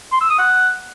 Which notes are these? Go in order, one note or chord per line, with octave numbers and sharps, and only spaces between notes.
C6
E6
D#6
F#5